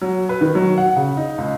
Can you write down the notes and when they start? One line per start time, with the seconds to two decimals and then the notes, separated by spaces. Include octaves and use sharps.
0.01 F#3
0.29 B4
0.41 D#3
0.55 F#3
0.78 F#5
0.96 C#3
1.17 D#4
1.38 C#2